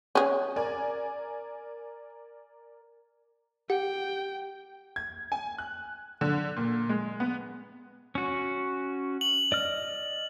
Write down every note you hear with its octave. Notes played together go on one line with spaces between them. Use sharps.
C#4 G#4
A#4 D5 G#5
G4 F#5 G5
G#6
G#5
F#6
D3
A#2
G#3
B3
C#4 F#4
F#7
D5 D#5 F6